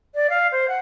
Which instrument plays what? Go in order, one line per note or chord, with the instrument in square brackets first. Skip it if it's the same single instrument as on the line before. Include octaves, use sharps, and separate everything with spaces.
[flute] D5
F5
C5
F#5